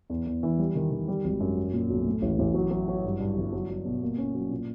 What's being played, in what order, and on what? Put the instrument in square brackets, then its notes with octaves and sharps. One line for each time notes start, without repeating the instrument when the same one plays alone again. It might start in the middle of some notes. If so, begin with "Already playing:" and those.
[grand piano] E2
E2
E3
G3
D#3
D#3
G3
G#1
F#2
F#3
A#2
B1
A2
A1
A1
F#3
F#3
F#3
G2
G2
G1
F#3
F#3
B2
A#3
C#4
F#3
A#2